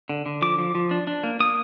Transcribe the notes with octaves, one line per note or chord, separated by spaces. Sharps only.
D3
D3
F3 D6
F3
F3
D4
D4
A#3
A#3 D#6